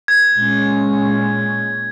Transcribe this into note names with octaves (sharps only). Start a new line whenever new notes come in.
G#6
A#2 G#3 C#4